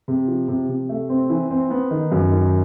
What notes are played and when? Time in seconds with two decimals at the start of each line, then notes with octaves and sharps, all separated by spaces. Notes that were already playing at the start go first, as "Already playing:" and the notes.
0.08 C3
0.28 F3
0.48 C3
0.69 C3
0.89 A3
1.09 C4
1.30 E3
1.51 C4
1.70 B3
1.91 D#3
2.12 F#2
2.31 D#3